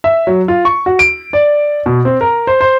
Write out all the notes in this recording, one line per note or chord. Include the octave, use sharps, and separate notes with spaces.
E5
F#3
F4
C#6
F#4
D7
D5
B2
C4
A#4
C5
C5